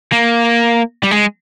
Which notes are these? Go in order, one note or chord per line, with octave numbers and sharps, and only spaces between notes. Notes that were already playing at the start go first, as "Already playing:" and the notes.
A#3
G3
G#3